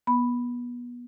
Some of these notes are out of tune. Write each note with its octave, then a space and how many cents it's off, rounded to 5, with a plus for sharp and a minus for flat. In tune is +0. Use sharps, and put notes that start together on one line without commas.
B3 -25 B5 +0